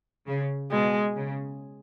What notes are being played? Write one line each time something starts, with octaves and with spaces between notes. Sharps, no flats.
C#3
B2 G#3
C#3